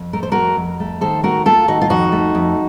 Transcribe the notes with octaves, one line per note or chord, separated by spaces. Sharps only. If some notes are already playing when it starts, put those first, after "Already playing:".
Already playing: F2
A3 A#4
C5
F2 F#4 A#4
F2
A3
D#3 A4 C5
A3 F#4 A#4
A3 F4 A4
D#3 D#4 F#4
F4
F2 D#4 F#4
A3
F2